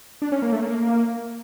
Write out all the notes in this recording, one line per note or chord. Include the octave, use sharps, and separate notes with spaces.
D4
C#4
A#3
A3
A#3